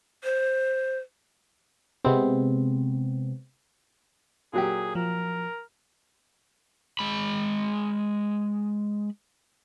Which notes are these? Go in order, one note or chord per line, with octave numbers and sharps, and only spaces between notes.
C5
C3 G#3 B3 C4
A#2 F#3 G4 G#4
F3 A#4
G#3 B5